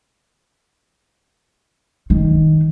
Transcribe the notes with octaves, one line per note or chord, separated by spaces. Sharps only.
D#3